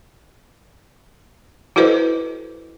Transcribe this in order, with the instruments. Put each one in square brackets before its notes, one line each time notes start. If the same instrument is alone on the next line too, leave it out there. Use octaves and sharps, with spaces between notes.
[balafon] E4 F#4 A4 B4 C5 D#5